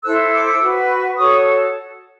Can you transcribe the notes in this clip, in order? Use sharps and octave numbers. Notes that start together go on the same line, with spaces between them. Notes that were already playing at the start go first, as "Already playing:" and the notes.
E4 A4 C5 E6 F#6
D6 E6
F#4 B4
F#4 A4 C#5 C#6 D#6